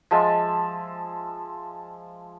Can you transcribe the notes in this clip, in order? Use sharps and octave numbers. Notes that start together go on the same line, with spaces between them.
F3 G#3 E5 A5